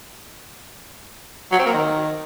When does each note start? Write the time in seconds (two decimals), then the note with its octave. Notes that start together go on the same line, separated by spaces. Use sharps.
1.51 F#3
1.59 C4
1.66 A#3
1.73 D#3